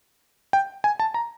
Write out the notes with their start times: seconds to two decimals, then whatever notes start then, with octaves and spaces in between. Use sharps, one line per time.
0.53 G5
0.84 G#5
1.00 A5
1.14 A#5